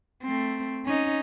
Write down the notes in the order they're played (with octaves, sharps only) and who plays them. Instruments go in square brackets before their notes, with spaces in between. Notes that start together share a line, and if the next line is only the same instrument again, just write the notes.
[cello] A3 C4
C#4 D#4